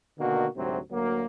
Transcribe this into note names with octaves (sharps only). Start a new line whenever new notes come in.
B2 D3 D#3 A#3 F#4
D2 G#2 C3 F#3 C4
D2 F#3 A#3